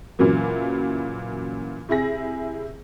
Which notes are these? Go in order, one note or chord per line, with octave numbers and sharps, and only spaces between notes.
A#2 C#3 E3 F#3 A#3
C3 E4 G#4 A#6